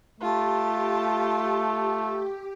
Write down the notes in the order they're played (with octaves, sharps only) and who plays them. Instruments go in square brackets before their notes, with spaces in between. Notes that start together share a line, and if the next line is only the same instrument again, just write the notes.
[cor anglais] A3 [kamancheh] F4 A5 [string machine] G4